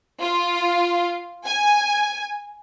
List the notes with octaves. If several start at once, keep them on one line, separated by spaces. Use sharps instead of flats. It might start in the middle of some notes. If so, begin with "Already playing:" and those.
F4
G#5